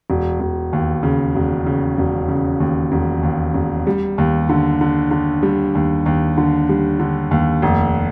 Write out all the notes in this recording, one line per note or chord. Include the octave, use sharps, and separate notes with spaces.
E1
E1
D#2
C#3
E1
C#3
E1
C#3
D#2
E1
D#2
E1
G3
D#2
D3
D3
D3
G3
D#2
D#2
D3
G3
D3
D#2
F1